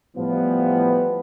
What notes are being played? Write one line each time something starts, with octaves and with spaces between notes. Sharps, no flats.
A2 E3 F3 G3 B3